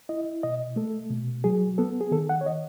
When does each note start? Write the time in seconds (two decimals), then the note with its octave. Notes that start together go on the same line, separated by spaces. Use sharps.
0.09 E4 D#5
0.43 B2 D#5
0.76 A3 A4
1.10 B2
1.44 F#3 G#4
1.78 B3 A4
2.01 G#4
2.11 D#3 A4
2.29 F#5
2.41 C#5
2.46 D#5